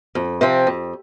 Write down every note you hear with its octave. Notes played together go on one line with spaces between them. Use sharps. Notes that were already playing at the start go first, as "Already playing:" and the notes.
F2
C3 F3 C4
F2